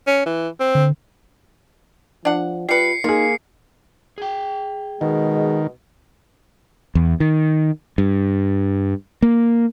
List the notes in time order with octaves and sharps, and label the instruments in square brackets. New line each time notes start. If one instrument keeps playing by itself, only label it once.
[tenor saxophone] C#4
E3
C4
[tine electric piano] D3
[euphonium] F3 [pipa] D4 F#5
[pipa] G3 B4 [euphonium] F4 [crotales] C7 C#7
[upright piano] A#3 G#4 [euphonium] D#4 [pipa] F4
[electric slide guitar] G#4 G5
[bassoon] B2 [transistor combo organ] D#3 [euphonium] G#3
[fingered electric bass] E2
D#3
G2
A#3